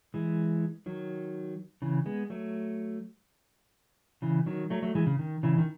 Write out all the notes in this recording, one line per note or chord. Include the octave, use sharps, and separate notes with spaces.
E3 G#3
D#3 F#3
C#3 E3
G#3 B3
F#3 A3
C#3 E3
D#3 F#3
F#3 A3
F#3 A3
E3 G#3
C#3
D#3
C#3 E3
D#3